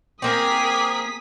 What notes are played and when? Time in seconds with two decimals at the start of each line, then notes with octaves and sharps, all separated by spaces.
0.22 A#3 C4 G#4 A#4 D6 D#6 B6